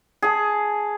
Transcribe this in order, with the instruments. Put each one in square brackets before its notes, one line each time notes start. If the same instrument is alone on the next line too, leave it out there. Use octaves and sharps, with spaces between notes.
[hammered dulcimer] G#4 A5